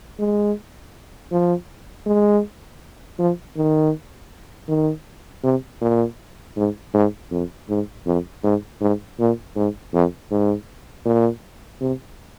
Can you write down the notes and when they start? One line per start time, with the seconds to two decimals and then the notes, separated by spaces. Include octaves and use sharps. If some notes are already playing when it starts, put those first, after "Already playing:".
0.19 G#3
1.32 F3
2.06 G#3
3.19 F3
3.57 D#3
4.68 D#3
5.44 C3
5.82 A#2
6.56 G#2
6.94 G#2
7.31 F2
7.69 G#2
8.06 F2
8.44 G#2
8.81 G#2
9.19 A#2
9.56 G#2
9.93 F2
10.31 G#2
11.05 A#2
11.81 C3